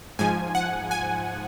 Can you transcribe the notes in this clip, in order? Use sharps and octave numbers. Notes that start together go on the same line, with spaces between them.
G#2 F3 G#5
F#5
G#5